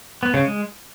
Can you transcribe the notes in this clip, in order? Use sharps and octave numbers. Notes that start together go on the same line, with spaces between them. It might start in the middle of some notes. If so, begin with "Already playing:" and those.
B3
C#3
G#3